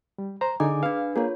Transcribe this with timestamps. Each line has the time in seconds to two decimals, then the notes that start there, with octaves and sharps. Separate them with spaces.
0.18 G3
0.41 C5 A#5
0.60 D3 D#4 G#4 G#5 D6
0.83 D4 B4 F5
1.16 A#3 F4 G#4 C#5